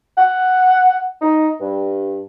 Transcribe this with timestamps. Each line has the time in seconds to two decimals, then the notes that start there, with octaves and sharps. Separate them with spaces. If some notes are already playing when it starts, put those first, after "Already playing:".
0.18 F#5
1.22 D#4
1.61 G2